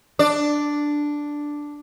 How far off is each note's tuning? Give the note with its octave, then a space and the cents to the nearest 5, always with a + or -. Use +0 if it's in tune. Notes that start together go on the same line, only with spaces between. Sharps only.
D4 +0 D5 +0